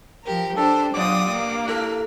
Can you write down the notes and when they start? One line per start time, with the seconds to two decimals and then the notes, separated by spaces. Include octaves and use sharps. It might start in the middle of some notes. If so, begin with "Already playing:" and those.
0.24 F3 G4 A#4
0.57 D4 G4 A4 C5
0.94 G2 A#2 F#3 F4 D5 D6 D#6
1.31 A#3
1.68 E4 A4 A#4